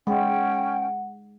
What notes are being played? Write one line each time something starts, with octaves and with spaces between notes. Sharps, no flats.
G#3 C#4 F#5 G5